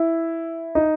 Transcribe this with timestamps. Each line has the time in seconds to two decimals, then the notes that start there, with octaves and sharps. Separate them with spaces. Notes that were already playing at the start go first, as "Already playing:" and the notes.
Already playing: E4
0.75 D#4